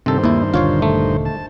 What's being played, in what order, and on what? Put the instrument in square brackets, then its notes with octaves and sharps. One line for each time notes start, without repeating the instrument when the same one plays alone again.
[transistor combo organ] G2 D#3 C5 [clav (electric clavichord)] C3 A4
[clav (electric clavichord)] D#2 E4 [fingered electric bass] A#3
[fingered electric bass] D#1 D3 D4 [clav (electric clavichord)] F4 C#5 F5
[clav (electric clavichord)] A3
[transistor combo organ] A5